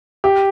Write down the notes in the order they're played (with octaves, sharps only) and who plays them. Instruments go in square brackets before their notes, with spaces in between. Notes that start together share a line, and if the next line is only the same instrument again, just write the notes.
[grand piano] G4